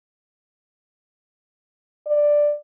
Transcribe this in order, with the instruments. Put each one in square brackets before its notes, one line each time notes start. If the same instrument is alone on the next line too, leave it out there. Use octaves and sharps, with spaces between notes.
[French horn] D5